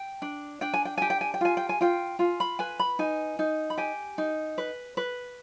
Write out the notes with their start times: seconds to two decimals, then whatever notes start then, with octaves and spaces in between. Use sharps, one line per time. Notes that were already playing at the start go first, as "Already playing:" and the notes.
Already playing: G5
0.22 D4
0.61 D4 G5
0.73 G#5
0.85 G5
0.98 G4 G#5
1.10 G5
1.21 G#5
1.34 G5
1.41 F4 G#5
1.57 G5
1.69 G#5
1.81 F4 G5
2.19 F4 G#5
2.40 B5
2.59 B4 G#5
2.79 B5
2.99 D#4 G#5
3.39 D#4
3.70 B5
3.78 G4 G#5
4.18 D#4
4.58 B4
4.97 B4